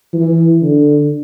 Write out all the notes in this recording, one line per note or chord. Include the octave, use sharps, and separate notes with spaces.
E3
D3